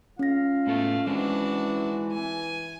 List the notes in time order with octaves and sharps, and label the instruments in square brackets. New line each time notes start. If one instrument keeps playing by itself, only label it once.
[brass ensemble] G#3 F4 F5 [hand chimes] C#4 A#6
[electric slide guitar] A2 B3 A4 [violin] A3
[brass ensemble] E3 [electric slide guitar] G#3 C4 D#4 [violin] D4 F#4
[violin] G#5